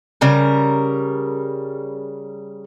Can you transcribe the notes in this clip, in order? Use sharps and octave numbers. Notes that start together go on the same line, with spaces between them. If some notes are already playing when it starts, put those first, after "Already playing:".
C#3 G3 A#4